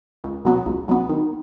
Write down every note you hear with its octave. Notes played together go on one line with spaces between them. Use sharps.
C#2
B2 F#3 B3
C#2
B2 F#3 B3
D#3